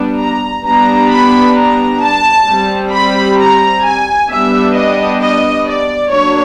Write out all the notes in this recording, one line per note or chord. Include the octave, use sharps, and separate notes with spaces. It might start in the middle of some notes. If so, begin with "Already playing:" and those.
Already playing: G3 B3 D4
A#5
G3 B3 D4 A#5
B5
A#5
A5
G3 C4
B5
A#5
G#5
G3 B3 D4 E5
D#5
D#5
D5
F#3 A#3 D4 C#5